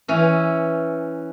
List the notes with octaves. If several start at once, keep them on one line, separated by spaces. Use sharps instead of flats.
E3 C#4